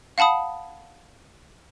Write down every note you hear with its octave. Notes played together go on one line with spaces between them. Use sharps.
F5 F#5 A5 B5 D#6